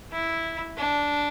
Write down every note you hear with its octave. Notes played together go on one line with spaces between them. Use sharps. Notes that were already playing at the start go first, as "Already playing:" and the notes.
E4
D4